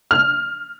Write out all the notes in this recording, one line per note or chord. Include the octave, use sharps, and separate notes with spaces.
F6